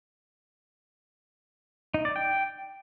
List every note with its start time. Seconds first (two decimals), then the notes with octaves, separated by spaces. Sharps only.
1.94 D#4
2.05 D5
2.16 G5